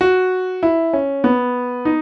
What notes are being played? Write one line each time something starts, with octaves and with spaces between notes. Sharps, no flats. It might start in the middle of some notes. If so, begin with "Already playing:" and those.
F#4
E4
C#4
B3
D#4